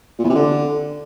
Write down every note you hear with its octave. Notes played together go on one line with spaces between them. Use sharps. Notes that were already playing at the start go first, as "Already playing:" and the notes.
A#2
E2
C3
D3